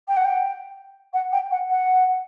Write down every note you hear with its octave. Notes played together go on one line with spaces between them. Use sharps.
G5
F#5
G5
F#5
G5
F#5
F#5